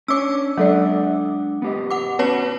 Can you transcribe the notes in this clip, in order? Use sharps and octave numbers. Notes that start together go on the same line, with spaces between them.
C#4 D4 C#5 D6 E6
F#3 G#3 D4 A4 D5 F#5
B3 G4 D#5
F#5 D6
B3 C#4 F#4 B4 C#5 A5